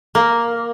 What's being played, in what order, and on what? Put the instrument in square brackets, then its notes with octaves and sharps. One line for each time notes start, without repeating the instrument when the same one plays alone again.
[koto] A#3